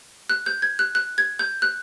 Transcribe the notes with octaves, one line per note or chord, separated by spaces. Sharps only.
F#6
G6
G#6
F#6
F#6
G#6
G6
F#6